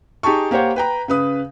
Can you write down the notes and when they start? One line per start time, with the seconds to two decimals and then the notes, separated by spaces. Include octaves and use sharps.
0.23 D#4 G4 G#4 A5 C#6
0.51 A#3 G4 C5 C#5 F#5
0.76 B4 G5 A#5
1.08 C#3 B4 D#6